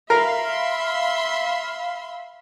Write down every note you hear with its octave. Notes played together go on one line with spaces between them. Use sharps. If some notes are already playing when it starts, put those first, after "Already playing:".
A#4 E5 F5 B5 C6